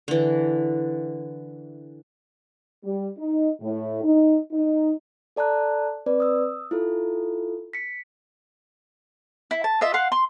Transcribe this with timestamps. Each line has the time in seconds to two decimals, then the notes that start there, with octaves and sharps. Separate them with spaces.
0.08 D3 E3
2.84 G3
3.19 D#4
3.61 A2
4.04 D#4
4.52 D#4
5.36 A4 D5 A5 A#5 F#6
6.06 C4 B4 D5
6.20 D#6 E6
6.71 E4 F4 A4
7.73 B6 C#7
9.51 E4
9.64 A5
9.81 F4 D#5 E5
9.94 F5 F#5 C6
10.12 C6